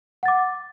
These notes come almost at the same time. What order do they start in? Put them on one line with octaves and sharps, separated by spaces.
F#5 A6 D6